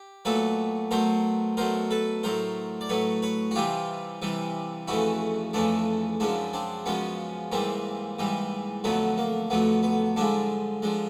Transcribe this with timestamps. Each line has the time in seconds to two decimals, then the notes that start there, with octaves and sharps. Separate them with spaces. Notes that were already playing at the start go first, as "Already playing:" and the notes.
Already playing: G4
0.25 A#2 F#3 A3 A4 B4
0.91 B2 F#3 A3 A#4 C5
1.57 B2 F#3 A3 A#4 C5
1.91 A4 B4
2.23 A2 F#3 A3 A#4 C5
2.81 D5
2.89 A2 F#3 A3 B4 C#5
3.22 B4 C#5
3.51 F#4
3.55 C3 E3 G3 F4 G4
4.22 C3 E3 G3
4.87 F2 C#3 E3 A3 E4 F#4
5.53 F2 C#3 E3 A3 D4 E4
6.20 F#2 C#3 F3 G#3 D4 E4
6.53 C4 D4
6.86 F#2 C#3 F3 G#3 B3 C#4
7.52 G#2 E3 G3 A#3 C4
8.19 G#2 E3 G3
8.84 F2 D3 F#3 A3 B3
9.18 A#3
9.50 F2 D3 F#3 A3 B3
9.83 B3
10.16 G2 D3 F3 G#3 D4 E4
10.82 D3 F3 G#3